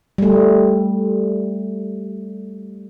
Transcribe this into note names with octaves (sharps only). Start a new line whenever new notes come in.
G3 A3